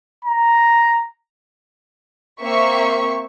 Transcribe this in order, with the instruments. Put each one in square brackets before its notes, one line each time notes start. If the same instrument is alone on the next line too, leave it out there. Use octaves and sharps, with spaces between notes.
[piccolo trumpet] A#5
[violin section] A#3 C4 E5 C#6